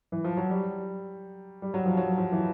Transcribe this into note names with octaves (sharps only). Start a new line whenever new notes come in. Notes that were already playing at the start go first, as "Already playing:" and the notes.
E3
F3
F#3
G3
G3
F#3
F3
F#3
F3
E3